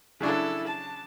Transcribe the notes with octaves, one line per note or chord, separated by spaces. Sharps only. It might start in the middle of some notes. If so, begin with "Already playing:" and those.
C#3 F#3 D4 E4 A4
A5